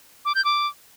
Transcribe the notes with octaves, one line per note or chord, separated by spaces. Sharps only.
D6
G6
D6